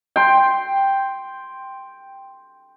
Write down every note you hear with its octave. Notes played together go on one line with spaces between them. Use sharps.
G5 C6